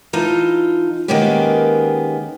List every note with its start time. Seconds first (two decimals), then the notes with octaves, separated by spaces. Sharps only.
0.13 E3 D#4 F4 A5
1.08 D#3 G#3 A#3 B3 C#4 G4